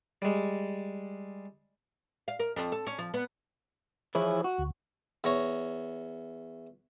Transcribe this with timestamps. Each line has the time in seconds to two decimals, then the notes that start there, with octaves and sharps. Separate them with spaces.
0.22 G3 G#3
2.28 F5
2.39 A#4
2.56 F2
2.72 A4
2.87 C#4
2.98 F3
3.14 B3
4.15 E3 F3 E4 G#4 C#5
4.44 F#4
4.58 D2
5.24 E2 C#5 A#5 C#6